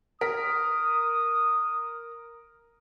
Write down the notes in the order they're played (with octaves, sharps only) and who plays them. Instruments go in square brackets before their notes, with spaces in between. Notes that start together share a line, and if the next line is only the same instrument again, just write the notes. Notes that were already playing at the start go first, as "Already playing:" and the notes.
[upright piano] A#4 B6 [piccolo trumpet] D#6